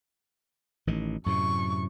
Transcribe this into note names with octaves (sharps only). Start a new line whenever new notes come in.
A1 D#3
F#2 A2 C3 C#6